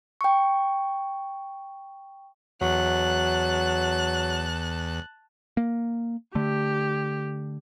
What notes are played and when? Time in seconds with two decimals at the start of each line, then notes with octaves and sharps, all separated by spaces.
0.21 G5 C#6
2.61 E2 F#3 A5 F#6
5.57 A#3
6.35 D3 A3 G4